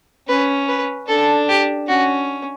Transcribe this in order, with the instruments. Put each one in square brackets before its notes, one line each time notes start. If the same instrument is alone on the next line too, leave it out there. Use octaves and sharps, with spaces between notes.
[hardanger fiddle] C#4 [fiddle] B4
[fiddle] B4
[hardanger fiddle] D4 [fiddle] A4
[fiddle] G4
[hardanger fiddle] C#4 [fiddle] F#4